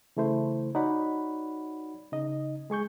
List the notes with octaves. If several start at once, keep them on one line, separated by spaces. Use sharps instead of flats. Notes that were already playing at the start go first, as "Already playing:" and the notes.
C#3 E3 A3 E4 C5
D#4 F#4 C#5 D5 F#5 B5
C#3 D#4 D#5
G#3 G#4 C#6 G6